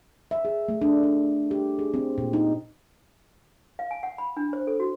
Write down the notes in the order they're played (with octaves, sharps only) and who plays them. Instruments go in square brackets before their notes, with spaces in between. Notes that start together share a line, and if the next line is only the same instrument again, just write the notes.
[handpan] E5
G#4
A3
D4
D4
G4
G#4
C4
A#2
D#4
[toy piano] F5
G#5
F#5
B5
D4
C5
A4
F#4